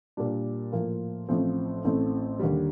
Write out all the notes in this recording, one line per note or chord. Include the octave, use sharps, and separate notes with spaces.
A#2 G3 D4
A2 F3 A#3 F4
A1 A2 F3 C4
A1 A2 A3 C4
D#2 D3 G3